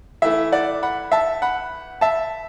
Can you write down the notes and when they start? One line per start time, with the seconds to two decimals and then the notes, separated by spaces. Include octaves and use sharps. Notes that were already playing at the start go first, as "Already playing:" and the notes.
0.22 E3 A3 E4 E5
0.52 D5 F#5
0.83 F#5 B5
1.12 E5 A5
1.42 F#5 B5
2.01 E5 A5